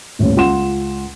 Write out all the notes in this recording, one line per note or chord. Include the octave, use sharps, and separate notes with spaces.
D#1 A1 C#5
C#2 F4 F#5 C6 E7